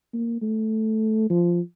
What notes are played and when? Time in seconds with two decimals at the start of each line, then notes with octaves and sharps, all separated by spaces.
0.14 A#3
0.42 A3
1.30 F3